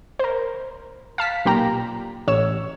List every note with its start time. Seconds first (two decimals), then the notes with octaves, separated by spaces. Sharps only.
0.19 A#4 C5
1.18 F5 A5 B6
1.45 B1 A#2 G4 A#5
2.28 A1 C#5 E6